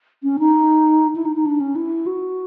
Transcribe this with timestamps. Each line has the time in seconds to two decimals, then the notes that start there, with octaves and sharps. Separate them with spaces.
0.23 C#4
0.39 D#4
1.15 E4
1.25 D#4
1.36 D#4
1.46 D4
1.60 C#4
1.75 E4
2.06 F#4